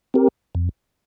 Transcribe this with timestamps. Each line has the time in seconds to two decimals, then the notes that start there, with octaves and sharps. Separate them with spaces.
0.14 C4 G4 A#4
0.55 F2